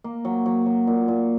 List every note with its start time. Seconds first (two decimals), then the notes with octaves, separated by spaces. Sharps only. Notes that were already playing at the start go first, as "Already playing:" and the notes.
0.04 A#3
0.25 F#3
0.46 F#3
0.66 F#3
0.87 A#2
1.08 A#2